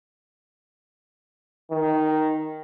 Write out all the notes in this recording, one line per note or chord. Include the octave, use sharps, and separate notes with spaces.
D#3